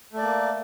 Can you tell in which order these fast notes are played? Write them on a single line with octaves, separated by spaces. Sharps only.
A3 D5 A#3